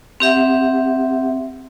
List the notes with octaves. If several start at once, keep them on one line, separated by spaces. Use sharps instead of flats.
C4 G4 E5 F#5